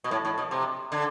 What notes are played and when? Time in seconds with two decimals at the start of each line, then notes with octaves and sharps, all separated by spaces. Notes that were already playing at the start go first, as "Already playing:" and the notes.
0.04 B2
0.11 A2
0.25 A2
0.38 B2
0.51 C3
0.92 D3